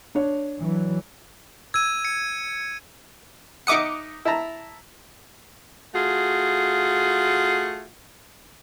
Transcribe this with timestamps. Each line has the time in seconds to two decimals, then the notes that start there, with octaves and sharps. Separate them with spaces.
0.15 D4 C#5
0.60 E3 F#3
1.74 E6 G#6 D#7
2.05 C#7
3.67 D#4 E5 F#5 D6 D#6 C#7
4.25 E4 A5 A#5
5.95 A3 F4 F#4 G#4